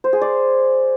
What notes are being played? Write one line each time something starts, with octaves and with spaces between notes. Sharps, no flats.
C5
G#4
D5